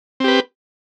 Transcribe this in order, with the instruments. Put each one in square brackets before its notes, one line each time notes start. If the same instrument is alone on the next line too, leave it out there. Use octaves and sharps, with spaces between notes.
[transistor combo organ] C4
G4
B4